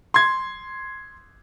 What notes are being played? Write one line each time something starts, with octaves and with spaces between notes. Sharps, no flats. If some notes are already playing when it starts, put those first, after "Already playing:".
C6 G#6